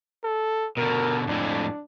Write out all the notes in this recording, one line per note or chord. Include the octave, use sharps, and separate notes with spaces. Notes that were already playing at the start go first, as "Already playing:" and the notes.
A4
B2 D3 A#4
F2 A2 G#3 D4